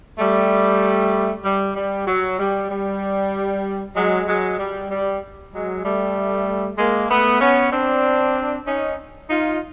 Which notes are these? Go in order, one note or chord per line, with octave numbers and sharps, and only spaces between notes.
G3 A3
G3
G3
F#3
G3
G3
F#3 G#3
F#3 G#3
G3
G3
F#3 G#3
G3 A3
G#3 A#3
A3 B3
B3 C#4
C4 D4
C#4 D#4
D#4 F4